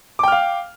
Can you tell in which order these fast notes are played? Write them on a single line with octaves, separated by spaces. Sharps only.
D6 G5 F6 F5